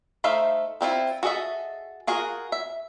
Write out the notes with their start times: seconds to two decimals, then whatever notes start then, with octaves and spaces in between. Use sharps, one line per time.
0.24 A3 D#4 C5 E5 F5
0.81 G3 C4 E4 F4
1.23 F#4 G#4 A4 D#5 E5
2.07 F4 F#4 G#4 A#4
2.52 E5